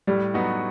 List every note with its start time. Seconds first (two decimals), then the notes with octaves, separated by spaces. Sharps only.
0.07 A2 G3
0.34 F#3 B3 D#4 F#4